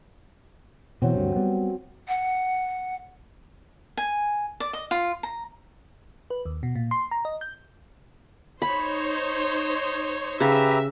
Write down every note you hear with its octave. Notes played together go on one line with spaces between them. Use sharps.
B2 E3 F#3 C4
D2 G2
G3 B3
F#5
G#5
D5
D#5
F4
A#5
B4
D#2
B2
A#2
C6
A#5
D#5
G6
D#4 C5 C#5 B5
C#3 G4 B4 E5 A#5